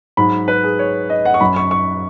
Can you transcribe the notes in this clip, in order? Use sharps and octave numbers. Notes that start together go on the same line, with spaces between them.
G#2 F#3 B5
B4
G#4
C#5
D#5
F#5
C#6
F#2 F#3 B5
C#6
C#6